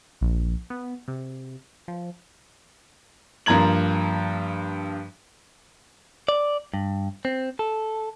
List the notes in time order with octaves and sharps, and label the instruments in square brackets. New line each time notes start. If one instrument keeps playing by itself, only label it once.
[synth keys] A#1
B3
C3
F3
[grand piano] G2 F3 A#3 A#5 G#6 F#7
[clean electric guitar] D5
G2
C4
A4